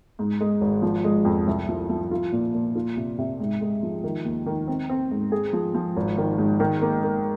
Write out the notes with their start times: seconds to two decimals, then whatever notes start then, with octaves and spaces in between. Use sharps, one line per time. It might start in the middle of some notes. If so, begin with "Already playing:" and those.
0.19 G#2
0.41 G#3
0.61 G#1
0.82 F3
1.04 G#3
1.25 F2
1.47 C2
1.69 F3
1.90 F3
2.11 F4
2.32 A#2
2.54 A#2
2.75 F4
2.97 C3
3.18 C3
3.40 G#2
3.61 G#3
3.83 F3
4.04 D#3
4.25 D#2
4.46 D#3
4.68 C4
4.89 C4
5.11 G#2
5.32 G#4
5.53 F3
5.74 F3
5.96 G#1
6.18 D#3
6.38 G#2
6.60 D#3
6.82 A#3
7.03 A#3